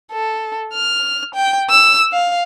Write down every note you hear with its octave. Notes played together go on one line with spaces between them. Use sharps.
A4
F6
G5
E6
F5